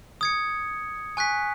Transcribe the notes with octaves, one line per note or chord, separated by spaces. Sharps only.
D#6 G#6 C#7
G#5 C#6 F#6 B6